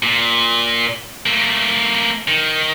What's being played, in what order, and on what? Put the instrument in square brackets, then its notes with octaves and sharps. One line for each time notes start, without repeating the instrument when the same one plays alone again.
[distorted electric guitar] A#2
A3 A#3
D#3